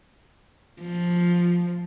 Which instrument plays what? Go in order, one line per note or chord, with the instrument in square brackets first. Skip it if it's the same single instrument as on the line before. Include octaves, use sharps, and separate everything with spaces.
[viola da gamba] F3